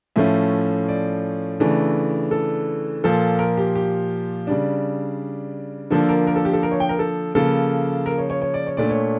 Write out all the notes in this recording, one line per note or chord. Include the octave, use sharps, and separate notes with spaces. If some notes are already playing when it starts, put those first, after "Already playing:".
A2 F3 A3 C#4 E5
D5
C#3 E3 A3 D4
A4
A#2 F3 A#3 A4
A#4
G4
G4
C#3 G3 D4
D3 F3 A#3 D4 A4
A#4
A#4
A4
G4
A4
A#4
C#5
G5
A#4
A4
C#3 F3 A#3 A4
A#4
C#5
C#5
C#5
D5
C#5
A#2 A3 D4 D5
C#5